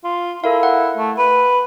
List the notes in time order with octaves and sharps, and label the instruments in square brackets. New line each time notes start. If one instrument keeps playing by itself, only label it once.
[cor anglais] F4
[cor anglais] E4 [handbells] A4 A#4 F5
[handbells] F#5
[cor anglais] A3
B4